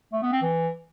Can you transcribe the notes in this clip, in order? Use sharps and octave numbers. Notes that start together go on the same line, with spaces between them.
A3
B3
C4
E3